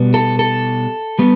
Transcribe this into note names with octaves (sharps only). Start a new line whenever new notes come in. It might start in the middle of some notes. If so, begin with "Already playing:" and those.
Already playing: B2 G3 B3
A4
A4
G3 B3